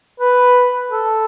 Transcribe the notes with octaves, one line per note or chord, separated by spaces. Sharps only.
B4
A4